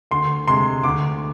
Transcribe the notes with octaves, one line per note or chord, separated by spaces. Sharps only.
D2 C6
C3 G#3 C6
D2 D6